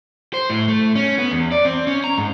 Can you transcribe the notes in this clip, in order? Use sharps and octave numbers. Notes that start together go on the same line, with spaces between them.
C5
A2
A3
C#4
B3
E2
D5
C4
C#4
A#5
G#2